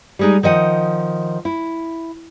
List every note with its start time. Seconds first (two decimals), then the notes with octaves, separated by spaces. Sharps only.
0.19 G3 G#3 D#4
0.43 D#3 F3 D#5 F#5
1.45 E4